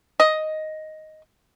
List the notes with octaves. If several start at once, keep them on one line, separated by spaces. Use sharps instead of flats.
D#5